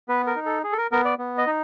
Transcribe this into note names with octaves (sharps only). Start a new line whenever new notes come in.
B3 B4
A#4
D#4
A4
G#4
A4
A#4
B3 A#4
D5
B3
D#5
D#4